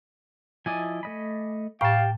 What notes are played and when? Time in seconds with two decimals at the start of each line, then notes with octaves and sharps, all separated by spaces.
0.66 F3 E4 D5 D#5 G#5
1.03 A3 D#5 B5
1.81 A2 G4 F5 G5 A5 C#6